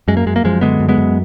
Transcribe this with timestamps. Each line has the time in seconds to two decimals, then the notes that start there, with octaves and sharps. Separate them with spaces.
0.08 F#2 G#3
0.17 A#3
0.26 F#2 G#3
0.36 A#3
0.44 F#2 F3 G#3
0.61 D3 G#3 B3
0.80 F#2
0.89 G#3 B3
0.98 F#2